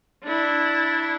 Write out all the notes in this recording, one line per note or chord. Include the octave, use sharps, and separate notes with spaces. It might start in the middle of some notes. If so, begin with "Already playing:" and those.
D4 E4